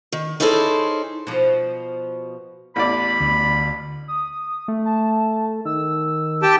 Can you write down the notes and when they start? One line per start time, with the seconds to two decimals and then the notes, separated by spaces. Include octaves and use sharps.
0.12 D#3
0.40 C#4 D#4 E4 G#4 A4 C5
1.27 B2 F3
2.76 A1 E2 D5 B5
3.20 D2
4.08 D#6
4.68 A3
4.85 A5
5.65 D#3 E6
6.43 G4 G5 A5